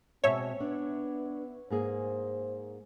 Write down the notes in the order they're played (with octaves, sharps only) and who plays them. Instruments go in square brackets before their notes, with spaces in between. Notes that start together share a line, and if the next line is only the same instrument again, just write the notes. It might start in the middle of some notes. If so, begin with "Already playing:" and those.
[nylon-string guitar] B2 G#3 A5 [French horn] C4 [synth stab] C#5 E5
[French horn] B3 [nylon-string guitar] D4
[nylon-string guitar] G#2 A#3 G#4 [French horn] C5